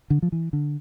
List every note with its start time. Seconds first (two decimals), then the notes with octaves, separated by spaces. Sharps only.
0.10 D3
0.22 F3
0.32 E3
0.53 D3